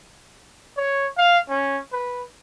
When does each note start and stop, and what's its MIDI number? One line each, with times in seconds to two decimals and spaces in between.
0.77 1.07 73
1.18 1.39 77
1.49 1.79 61
1.93 2.23 71